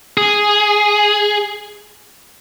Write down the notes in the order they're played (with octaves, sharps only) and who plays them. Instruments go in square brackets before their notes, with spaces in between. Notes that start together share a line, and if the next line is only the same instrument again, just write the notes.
[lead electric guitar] G#4